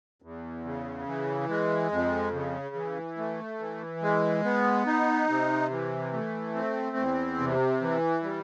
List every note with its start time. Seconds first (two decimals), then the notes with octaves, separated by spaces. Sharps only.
0.22 E2
0.65 C#3
1.07 E3
1.49 G#3
1.92 F2
2.33 C#3
2.75 E3
3.18 A3
3.60 E3
4.02 G#3
4.44 B3
4.86 D#4
5.29 C3
5.70 E3
6.13 A3
6.55 C4
6.97 E2
7.39 C3
7.82 E3
8.23 G3